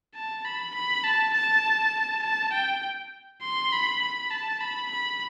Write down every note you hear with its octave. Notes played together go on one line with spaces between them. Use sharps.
A5
B5
B5
A5
A5
A5
G5
C6
B5
B5
A5
B5
B5